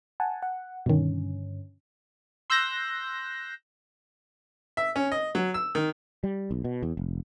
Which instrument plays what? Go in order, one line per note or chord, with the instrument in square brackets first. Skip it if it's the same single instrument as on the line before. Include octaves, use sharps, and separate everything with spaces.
[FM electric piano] F#5 G#5 A5
F#5
[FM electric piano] G2 D3 C#4 [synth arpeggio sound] B2 D#3
[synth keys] C6 E6 F#6 G6 A#6
[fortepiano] E5
C#4
D#5
F#3
E6
D#3
[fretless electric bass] G3
B1
B2
E2
F1